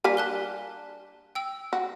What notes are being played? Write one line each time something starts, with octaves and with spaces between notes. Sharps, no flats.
G3 A#3 D4 G#5 F6 B6
A5 F#6 G7
G5 E6
F#4